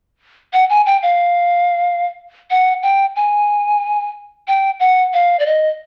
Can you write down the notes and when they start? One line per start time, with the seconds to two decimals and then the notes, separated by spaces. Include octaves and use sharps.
0.53 F#5
0.70 G#5
0.86 G5
1.03 F5
2.51 F#5
2.83 G5
3.16 G#5
4.48 G5
4.80 F#5
5.14 F5
5.40 D5
5.46 D#5